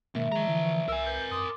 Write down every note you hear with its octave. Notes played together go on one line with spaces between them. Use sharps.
G#2 B2 D#3 A#3 E5
D#3 F3 G#3 A#5
D3 E3
C2 A#4 G#5 E6
B4 G6
F#2 C6 D6 D#6